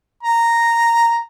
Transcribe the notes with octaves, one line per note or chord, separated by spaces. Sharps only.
A#5